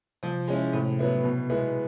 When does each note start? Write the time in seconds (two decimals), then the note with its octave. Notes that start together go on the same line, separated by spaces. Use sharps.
0.23 C3 F3
0.48 G#3 C#4 E4
0.73 A2 C3
0.99 F#3 B3 E4
1.24 B2
1.50 G#3 B3 E4